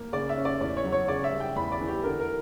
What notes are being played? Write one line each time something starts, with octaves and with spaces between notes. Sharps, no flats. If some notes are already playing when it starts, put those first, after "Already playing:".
Already playing: A#3
C#3 D5
E5
C#4
D5
E2 D5
C#5
F#3
C#5
C#3 D5
E5
G3
G5
E2 B5
D5
E3
G4
D3 A#4
A#4